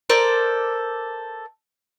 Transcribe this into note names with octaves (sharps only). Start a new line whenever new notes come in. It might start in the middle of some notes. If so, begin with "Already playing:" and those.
A4 A#4 C5 D5